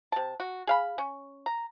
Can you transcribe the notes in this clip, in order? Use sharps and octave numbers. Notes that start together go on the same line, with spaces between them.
C3 A5
F#4
G#4 F5 B5
C#4
A#5